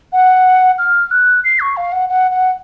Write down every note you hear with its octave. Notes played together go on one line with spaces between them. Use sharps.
F#5
F6
F#6
C7
C#6
F5
F#5
F#5
F#5